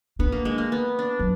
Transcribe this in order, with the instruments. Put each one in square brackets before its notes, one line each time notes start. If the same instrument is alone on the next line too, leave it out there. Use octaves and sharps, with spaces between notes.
[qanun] B3 [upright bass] D4
[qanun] A#3
G#3
A#3
B3
D4
[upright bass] F#3